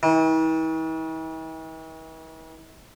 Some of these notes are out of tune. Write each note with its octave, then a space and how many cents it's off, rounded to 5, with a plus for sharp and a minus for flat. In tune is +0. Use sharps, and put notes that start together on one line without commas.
E3 -45